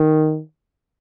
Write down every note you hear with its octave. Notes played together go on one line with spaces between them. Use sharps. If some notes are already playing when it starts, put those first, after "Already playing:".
Already playing: D#3